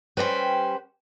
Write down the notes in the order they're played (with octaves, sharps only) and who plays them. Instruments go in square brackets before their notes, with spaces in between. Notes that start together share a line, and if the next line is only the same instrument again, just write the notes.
[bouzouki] G3 C#4 G5 [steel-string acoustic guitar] B4 C5